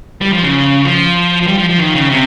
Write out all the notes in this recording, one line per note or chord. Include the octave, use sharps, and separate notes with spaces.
G3
F3
C#3
F3
F3
G3
F3
F3
D#3
C#3
C3